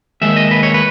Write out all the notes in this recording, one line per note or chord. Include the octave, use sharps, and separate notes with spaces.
D#2 D#3 G#3 E5
D#5
B4
C#5
B4